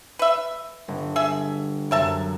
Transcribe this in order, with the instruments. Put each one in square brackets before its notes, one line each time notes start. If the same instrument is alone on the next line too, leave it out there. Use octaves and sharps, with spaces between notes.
[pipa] B4 E5
[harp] G1
[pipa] G#4 E5
[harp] F#2 C3 [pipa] A#4 E5 A5